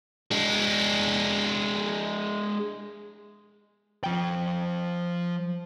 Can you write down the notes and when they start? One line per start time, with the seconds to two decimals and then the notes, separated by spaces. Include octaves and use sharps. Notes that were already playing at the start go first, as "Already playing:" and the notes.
0.31 G#3 D4
4.04 F3 G5